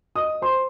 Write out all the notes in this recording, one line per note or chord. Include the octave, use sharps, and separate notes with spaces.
D#5 D#6
C5 C6